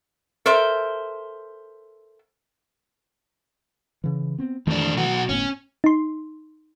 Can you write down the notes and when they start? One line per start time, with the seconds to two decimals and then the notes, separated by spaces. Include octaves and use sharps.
0.46 A4 A#4 C5 E5
4.04 C#3 E3
4.38 B3 C4
4.67 F2 D#3 E3 A3 D4
4.94 B1 F#4
5.29 G1 A2 B3 C#4
5.84 D#4 C6